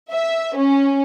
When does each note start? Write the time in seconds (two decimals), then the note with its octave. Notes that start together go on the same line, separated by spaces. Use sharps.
0.12 E5
0.57 C#4